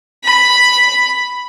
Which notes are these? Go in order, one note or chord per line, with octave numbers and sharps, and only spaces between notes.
B5